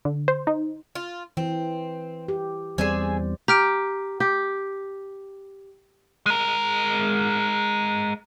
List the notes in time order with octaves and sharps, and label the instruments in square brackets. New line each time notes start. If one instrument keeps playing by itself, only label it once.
[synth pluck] D3
C5
D#4
[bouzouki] F4
[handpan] E3 [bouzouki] C4
[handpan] G4
[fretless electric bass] E2 G3 C4 [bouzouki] G#4 E5 G#5 [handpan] C5 D5
[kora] G4 [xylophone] A#5 F6 D7
[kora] G4
[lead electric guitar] G#3 A#4